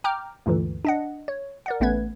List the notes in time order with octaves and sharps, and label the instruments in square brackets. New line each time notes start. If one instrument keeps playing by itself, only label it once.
[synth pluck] G5 A#5 D6 F6 G6
D2 G2 A#2 D3 E3
D4 D#5 F#5
C#5
A#4 D5 F#5
A1 A3 B3 C#4 B4 G#6